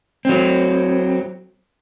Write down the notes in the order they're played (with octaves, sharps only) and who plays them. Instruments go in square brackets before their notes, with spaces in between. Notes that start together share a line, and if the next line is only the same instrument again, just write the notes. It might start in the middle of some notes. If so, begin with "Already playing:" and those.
[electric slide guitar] F#3 C4